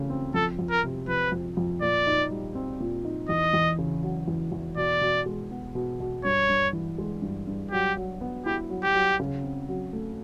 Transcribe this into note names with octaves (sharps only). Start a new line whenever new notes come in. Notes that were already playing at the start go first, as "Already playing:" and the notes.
Already playing: C#3 E3 A3
C4
F2 A4
F2
A#4
C3
F3 B4
F2
F2
A#2 D5
D#4
G3
C4
A#2
D#4
E2 D#5
E2
C#3
F#3
E2
E2
B2 D5
B2
G#3
B3
B2
B2
G2 C#5
G2
E3
G#3
G2
G2
F#3 G4
F#3
B3
E4 G4
F#3
G4
F#3
C#3
C4
F#3
A3